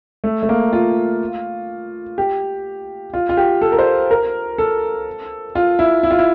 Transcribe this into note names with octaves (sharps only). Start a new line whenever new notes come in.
A3
A3
A#3
F4
G4
F4
F4
G4
A4
A#4
C5
A#4
A4
F4
E4
E4
F4
E4